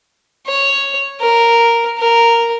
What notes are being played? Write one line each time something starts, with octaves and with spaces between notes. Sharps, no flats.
C#5
A#4
A#4